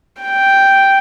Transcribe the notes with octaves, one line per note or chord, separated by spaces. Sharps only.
G5